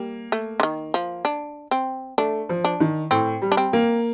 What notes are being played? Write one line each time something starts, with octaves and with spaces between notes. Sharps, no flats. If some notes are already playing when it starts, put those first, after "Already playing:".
Already playing: G3 A#3
A3
D3
D#3
F3
D4
C4
A3 D4
F3
D4
D#3
A2 C4
G3
D4
C4
A#3